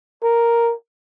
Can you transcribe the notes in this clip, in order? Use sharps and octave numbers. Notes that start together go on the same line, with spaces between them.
A#4